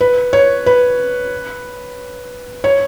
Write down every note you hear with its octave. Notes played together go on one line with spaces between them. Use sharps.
B4
C#5
B4
C#5